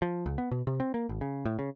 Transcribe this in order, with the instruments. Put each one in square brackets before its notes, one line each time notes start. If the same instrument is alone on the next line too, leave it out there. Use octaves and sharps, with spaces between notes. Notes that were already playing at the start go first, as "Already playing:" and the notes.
[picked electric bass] F3
C#2
B3
B2
C3
C4
A#3
G#1
C#3
A2
C#3